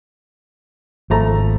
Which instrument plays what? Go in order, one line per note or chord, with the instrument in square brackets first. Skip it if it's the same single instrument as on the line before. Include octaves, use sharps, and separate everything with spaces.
[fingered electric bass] G#1 [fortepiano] F3 A3 A#5